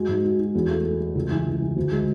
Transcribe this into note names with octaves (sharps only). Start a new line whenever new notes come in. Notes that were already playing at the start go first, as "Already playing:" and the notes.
Already playing: G#3 F#4
G#2
F#4
F#4
E2
A3
A3
A3
C#2
E3
C#2
E3
D2
G#3